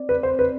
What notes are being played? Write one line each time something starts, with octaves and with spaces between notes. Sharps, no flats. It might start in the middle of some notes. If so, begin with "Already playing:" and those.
Already playing: C4 D5
B4
C5
B4